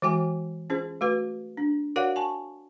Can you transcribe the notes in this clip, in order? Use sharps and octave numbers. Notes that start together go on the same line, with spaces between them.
E3 G#3 F#4 G5 G#5
C#4 F4 G#4 C5
A3 F#4 B4
D4
F#4 A#4 C#5 D5 F5 F#5
G#5 A5 C#6